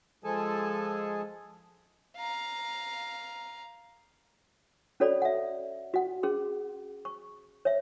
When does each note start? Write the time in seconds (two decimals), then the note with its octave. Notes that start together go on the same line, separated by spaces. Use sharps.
0.24 F3 G#3 G#4 A4 G#5 A5
2.17 F5 A#5
5.00 C#4 F#4 A4 C#5 D5 B5
5.22 E5 F#5
5.94 F#4 F#5
6.23 C#4 G#4 C6
7.05 C#6
7.65 C#5 E5